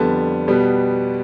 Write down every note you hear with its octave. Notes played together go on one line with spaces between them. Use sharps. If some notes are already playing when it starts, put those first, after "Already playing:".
Already playing: F2 D3 G3 B3 A5
B2 G3 B3